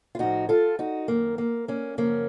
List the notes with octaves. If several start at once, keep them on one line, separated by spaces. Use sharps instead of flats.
F4
A2 F3 D#4 F#4
F4 A4
D#4 F#4
F#2 D#3 A#3
A#3
A#3 C#4
F#2 C#3 F3 A#3 C#4